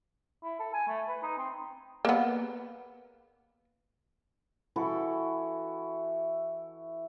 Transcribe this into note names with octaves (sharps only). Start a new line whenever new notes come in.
E4
A4
G#5
A3
B4
D#4
C4
A#3 B3
E3 E4 F#4 A4